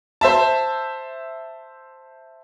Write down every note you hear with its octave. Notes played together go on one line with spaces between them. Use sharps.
C5 E5 A5